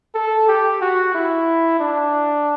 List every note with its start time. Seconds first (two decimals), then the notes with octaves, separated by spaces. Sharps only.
0.15 A4
0.48 G4
0.81 F#4
1.15 E4
1.80 D4